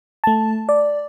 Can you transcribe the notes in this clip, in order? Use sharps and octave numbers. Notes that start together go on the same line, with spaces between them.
A3 A5
D5